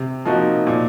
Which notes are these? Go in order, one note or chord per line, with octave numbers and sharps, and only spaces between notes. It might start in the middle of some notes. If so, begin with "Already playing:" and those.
Already playing: C3
F3 A#3 D#4 F#4
A#2